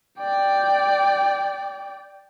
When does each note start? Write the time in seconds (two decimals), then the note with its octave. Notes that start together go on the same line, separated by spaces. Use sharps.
0.19 D5 G5